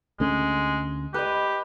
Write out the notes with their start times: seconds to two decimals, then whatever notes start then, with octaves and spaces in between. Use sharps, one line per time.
0.20 D2 G#3 A3 C#4
1.14 G4 B4 D#5